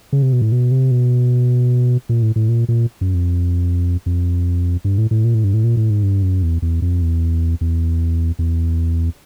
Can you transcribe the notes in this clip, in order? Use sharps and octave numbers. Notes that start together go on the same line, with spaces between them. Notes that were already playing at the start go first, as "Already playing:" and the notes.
C#3
C3
B2
A2
B2
C3
B2
A#2
A2
A2
A#2
A#2
F#2
F2
F2
G2
A2
A2
A#2
A2
G2
A2
A#2
A2
G#2
G2
F#2
E2
E2
F2
E2
E2
E2